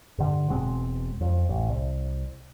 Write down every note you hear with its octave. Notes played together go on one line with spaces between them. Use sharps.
G2 D3
E1 B2 G#3 C4
F2
A1
C2